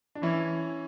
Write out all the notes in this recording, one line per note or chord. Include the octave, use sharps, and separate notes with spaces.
D4
E3 C#4 E4